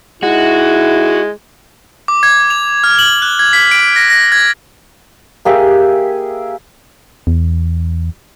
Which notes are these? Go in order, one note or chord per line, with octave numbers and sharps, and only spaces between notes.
G#3 D#4 E4 F#4
D6
G#6
F7
F6
F#7
F#6
G#6
B6
D7
A#6
A#6
G#6
A#3 G4 G#4 E5
E2